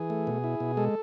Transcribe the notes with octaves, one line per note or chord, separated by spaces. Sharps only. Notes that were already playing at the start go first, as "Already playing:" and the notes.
Already playing: E3 G#4
A3
B2
E4
B2
G#3 A4